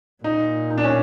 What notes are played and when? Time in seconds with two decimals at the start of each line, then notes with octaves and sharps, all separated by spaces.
0.24 A#2 D#4
0.70 D#4
0.78 D4
0.84 C#4